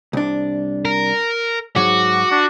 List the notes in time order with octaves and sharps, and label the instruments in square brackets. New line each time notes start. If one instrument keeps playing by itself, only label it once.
[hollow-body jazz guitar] C2 D4
[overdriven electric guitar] A#4
[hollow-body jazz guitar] G#2 F#3 [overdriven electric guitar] F#4 [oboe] D6
[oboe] D4